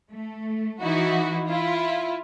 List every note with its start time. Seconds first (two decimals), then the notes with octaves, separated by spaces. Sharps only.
0.12 A3
0.82 E3 D#4 E4 F#4
1.47 E4 F4